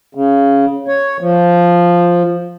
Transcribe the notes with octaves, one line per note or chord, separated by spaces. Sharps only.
C#3
C#5
F3